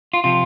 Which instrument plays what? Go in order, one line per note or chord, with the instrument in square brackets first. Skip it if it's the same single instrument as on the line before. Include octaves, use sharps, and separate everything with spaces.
[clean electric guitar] F4
C3 F3 F4